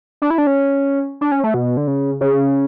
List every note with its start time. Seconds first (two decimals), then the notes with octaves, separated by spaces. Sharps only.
0.22 D4
0.30 E4
0.38 D4
0.47 C#4
1.21 D4
1.32 C#4
1.43 A3
1.54 B2
1.77 D3
1.87 C#3
2.21 C#3